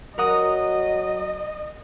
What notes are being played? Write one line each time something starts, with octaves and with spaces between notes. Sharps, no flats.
F#3 A#4 D#5 F#5 D#6